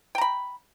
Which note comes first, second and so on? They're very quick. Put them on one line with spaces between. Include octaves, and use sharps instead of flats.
G5 A#5 B5